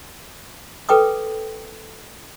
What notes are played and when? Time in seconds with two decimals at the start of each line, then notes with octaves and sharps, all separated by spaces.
0.89 A4 B4 G5 D6 D#6